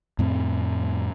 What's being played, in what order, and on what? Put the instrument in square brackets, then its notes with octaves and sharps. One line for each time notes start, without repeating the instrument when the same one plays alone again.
[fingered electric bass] F2 A2 C4